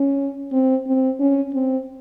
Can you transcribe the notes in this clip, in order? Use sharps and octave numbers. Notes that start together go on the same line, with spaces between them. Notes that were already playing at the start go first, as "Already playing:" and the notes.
Already playing: C#4
C4
C4
C#4
C4